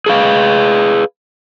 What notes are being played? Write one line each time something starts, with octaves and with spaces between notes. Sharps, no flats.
G#4 B4 F5